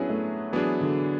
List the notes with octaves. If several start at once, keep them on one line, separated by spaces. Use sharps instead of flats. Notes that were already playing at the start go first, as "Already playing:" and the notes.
Already playing: F#3 B3 C#4 D4 E4 G#4 B4
A3
E3 F#3 B3 D4 G#4
D3